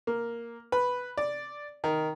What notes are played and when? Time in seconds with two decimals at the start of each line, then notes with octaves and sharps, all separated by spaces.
0.07 A#3
0.72 B4
1.17 D5
1.84 D#3